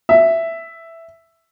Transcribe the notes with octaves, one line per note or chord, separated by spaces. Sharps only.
E5